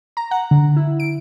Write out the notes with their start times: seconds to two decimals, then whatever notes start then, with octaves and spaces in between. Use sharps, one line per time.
0.17 A#5
0.31 F#5
0.51 D3
0.76 E4
1.00 D7